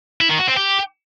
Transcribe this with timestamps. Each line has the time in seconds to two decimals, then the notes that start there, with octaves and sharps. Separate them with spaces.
0.21 E4
0.30 D#3
0.38 F#4
0.47 C4
0.56 G4